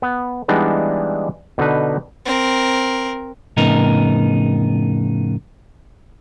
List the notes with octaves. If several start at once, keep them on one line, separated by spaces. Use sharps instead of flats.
B3
E3 G3 G#3 B3 D4 D#4
B2 D3 D#4 B4
C4 A#4
F2 A2 C#3 B3 D#4 A#4